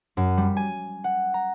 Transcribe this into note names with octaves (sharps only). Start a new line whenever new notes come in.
F#2
G3
G#5
F#5
A#5